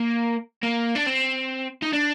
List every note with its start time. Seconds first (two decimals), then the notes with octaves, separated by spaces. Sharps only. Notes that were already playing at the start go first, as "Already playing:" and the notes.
Already playing: A#3
0.63 A#3
0.96 D4
1.07 C4
1.83 D#4
1.93 D4